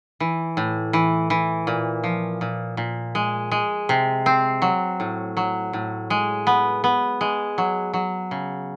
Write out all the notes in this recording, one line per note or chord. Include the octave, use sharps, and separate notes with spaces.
E3
A2
E3
E3
A#2
F3
A#2
A#2
G#3
G#3
C3
C4
F#3
A2
F#3
A2
G#3
B3
B3
G#3
F#3
F#3
C#3